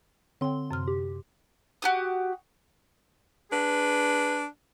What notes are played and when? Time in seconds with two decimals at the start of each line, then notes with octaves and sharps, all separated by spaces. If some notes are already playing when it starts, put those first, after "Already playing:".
0.41 D3 C4 C#5 G5 C6
0.71 F#2 C3 F6
0.87 G4
1.82 F#4 G4 D#6
3.51 D4 G#4 B4